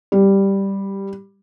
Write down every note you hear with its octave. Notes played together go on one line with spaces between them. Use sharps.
G3